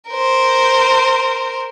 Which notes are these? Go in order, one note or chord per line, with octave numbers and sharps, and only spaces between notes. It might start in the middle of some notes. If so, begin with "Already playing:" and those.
A#4 C5